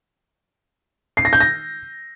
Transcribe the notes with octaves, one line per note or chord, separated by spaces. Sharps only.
C7
A#6
G6
A#6